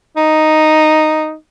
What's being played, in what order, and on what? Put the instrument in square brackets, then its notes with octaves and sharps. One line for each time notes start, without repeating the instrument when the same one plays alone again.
[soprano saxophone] D#4